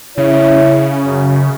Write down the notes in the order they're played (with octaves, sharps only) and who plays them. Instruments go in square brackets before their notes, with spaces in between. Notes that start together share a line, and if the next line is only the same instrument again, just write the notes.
[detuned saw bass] C#3 [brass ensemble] E4 C#5
[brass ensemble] F#2